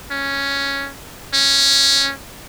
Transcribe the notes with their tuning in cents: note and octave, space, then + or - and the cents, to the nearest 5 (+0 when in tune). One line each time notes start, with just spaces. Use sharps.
C#4 +0
C#4 -5